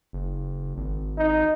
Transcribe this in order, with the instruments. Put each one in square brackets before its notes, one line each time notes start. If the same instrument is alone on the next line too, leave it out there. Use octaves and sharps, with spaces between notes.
[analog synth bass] F#1
G#1
[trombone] D#4